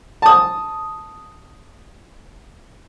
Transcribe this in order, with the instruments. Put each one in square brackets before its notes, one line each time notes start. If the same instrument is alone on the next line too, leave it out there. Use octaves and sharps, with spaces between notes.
[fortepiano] A5 D#6